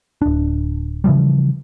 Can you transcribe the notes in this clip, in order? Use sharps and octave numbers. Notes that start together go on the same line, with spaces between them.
D1 D4
C#3 E3 F3 G3